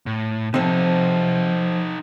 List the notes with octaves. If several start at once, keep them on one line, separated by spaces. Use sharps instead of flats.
A2
C3 F3 C4 D#4 A4